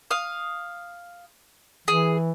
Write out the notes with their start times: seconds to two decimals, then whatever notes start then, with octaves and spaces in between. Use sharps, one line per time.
0.11 F5 D#6
1.88 E3 G#4